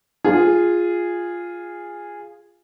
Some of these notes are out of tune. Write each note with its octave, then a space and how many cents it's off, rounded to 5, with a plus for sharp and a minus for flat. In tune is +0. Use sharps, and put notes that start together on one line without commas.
F4 +0 G#4 -10